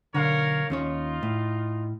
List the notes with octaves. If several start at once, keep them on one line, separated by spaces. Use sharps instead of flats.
B1 D3 A#4 C#5 F5
D#2 C#4 D#4 F4 C#5
A2